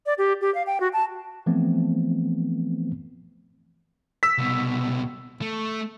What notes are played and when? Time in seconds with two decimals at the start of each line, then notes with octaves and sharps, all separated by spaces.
0.06 D5
0.18 G4
0.41 G4
0.55 F5
0.67 G5
0.80 F#4
0.93 A5
1.46 E3 F3 A3 B3 C4
4.23 E6 B6
4.38 C2 B2
5.41 A3